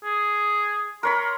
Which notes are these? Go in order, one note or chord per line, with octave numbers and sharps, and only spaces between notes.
G#4
A#4 C#5 B5 C6